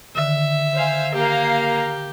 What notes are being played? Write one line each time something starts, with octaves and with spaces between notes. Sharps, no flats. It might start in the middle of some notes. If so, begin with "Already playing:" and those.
D3 D#3 E5
C5 F5 G#5
A#3 G4 F5 A#5